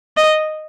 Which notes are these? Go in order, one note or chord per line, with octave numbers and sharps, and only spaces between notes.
D#5